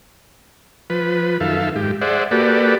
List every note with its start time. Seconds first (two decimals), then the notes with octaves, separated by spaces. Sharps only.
0.90 F3 B4
1.40 F#2 D#3 A4 E5 F5
1.76 G#2 G4
2.01 G#4 C5 D5 E5 F#5
2.31 A#3 F#4 G4 A4 B4 D5